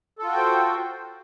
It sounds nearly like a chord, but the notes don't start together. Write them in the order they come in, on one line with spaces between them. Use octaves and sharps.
A4 F4 F#4 G5 C5